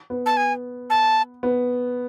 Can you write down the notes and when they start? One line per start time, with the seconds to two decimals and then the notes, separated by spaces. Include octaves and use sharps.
0.10 B3
0.26 A5
0.37 G#5
0.90 A5
1.43 B3